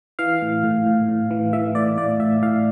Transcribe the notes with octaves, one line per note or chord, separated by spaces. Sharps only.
E3 F5
A2
A2
A2
A2
E3
E3 E5
A2 D5
A2 D5
A2 E5
A2 F5